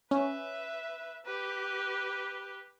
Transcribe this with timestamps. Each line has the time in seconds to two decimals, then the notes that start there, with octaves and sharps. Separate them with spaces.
0.11 C#4 B4 E5
1.26 G4 B4